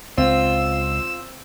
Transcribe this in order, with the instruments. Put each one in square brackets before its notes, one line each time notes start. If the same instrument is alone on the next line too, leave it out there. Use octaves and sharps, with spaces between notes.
[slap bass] C#2 [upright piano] C4 [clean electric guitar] F4 [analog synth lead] E6